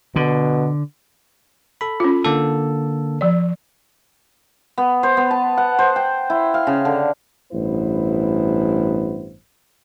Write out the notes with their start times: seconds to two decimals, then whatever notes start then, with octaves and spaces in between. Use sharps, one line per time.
0.16 B2 D3
1.81 A4 B5
2.00 C#4 F4
2.25 D3 A#3 A4
3.21 F3 D5
4.78 B3
5.03 C5
5.17 B3
5.31 A5
5.57 F#5
5.79 C5
5.96 G5
6.30 E4
6.54 F5
6.67 C#3
6.85 D3
7.52 A1 G2 B3 E4 C5